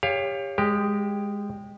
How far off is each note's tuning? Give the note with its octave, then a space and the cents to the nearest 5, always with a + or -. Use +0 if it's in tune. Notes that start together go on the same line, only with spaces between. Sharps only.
G4 +30 C#5 +0 F5 +0
G#3 -15 G4 +5